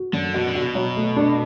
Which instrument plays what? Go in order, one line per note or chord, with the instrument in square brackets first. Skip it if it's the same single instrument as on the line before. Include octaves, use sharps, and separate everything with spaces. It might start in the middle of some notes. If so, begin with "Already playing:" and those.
Already playing: [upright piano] F#4
[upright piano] F#2 [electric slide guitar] D3
[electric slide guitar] B2 [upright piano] F#4
[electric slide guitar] D3
[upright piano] F#4
[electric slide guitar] B2
[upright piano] F#3
A3
D4